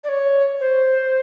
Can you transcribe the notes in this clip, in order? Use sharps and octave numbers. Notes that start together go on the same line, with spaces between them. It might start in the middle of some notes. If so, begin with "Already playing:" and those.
D5
C#5
C5